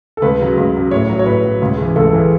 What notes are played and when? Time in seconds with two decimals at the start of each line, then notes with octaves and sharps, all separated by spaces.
0.17 A4
0.22 C#2 B4
0.40 C#3 F#3
0.57 C#2
0.75 C#3 F#3
0.91 A2 C#5
1.10 F#3
1.19 C#5
1.26 A2 B4
1.44 F#3
1.61 C#2
1.78 C#3 E3
1.96 C#2 A4
2.13 C#3 E3